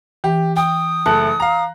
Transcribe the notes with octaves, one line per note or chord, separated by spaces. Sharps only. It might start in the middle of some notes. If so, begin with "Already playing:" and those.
E3 G4
G5 D#6
F#1 A3 A5 F#6
F5 A#5